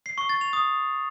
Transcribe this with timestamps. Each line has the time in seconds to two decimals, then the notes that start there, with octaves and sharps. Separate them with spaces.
0.06 C7
0.18 C#6
0.29 A6
0.41 F7
0.53 D#6